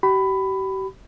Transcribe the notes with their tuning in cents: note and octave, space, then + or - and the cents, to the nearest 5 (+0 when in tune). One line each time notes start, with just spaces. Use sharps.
G4 -40 B5 +15